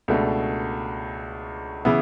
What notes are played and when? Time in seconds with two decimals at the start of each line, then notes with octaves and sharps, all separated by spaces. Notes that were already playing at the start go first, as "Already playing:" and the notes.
0.08 C#2 B2 A3 D4
1.85 C#3 E3 B3 E4